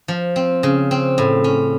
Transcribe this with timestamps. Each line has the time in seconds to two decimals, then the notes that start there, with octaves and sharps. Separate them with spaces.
0.08 F3
0.36 C4
0.63 C#3
0.91 C4
1.18 A2
1.44 C#4